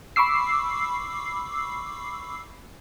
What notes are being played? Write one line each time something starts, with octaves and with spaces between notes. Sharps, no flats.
B5 C#6 D6 E6 C7